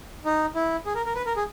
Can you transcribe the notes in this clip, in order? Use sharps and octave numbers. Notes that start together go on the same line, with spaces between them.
D#4
E4
G#4
A#4
A#4
B4
A#4
G#4